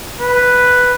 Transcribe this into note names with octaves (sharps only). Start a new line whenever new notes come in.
B4